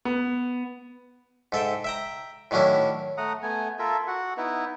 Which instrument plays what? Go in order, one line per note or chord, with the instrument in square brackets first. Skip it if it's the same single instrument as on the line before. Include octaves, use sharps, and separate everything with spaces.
[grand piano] B3
[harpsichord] G#2 A4 E5 G5
E5 G5 A#5
A2 D#3 F#3 C#4 D4 E4
[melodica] A3 F#5 A#5 D#6
A3 B3 G#5
F4 A4 A#4 E5
F#4 F#5
B3 D#4 E4 B4